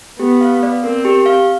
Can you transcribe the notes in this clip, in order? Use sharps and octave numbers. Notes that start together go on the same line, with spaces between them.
B3 G4
F5
D5
C4 A#4
G4
F5